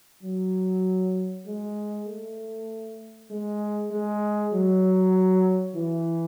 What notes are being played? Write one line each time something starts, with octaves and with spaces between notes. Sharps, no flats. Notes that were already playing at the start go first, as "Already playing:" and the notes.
F#3
G#3
A3
G#3
G#3
F#3
E3